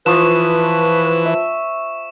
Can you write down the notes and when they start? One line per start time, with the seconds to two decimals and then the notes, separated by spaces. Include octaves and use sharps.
0.06 E3 F3 B4 C#6 E7
1.25 E5